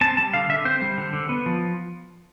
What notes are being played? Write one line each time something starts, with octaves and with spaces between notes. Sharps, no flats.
C4 A5
G3 A5
D3 F5
D3 E5
C4 C5
G3
D3
D3
B3
F3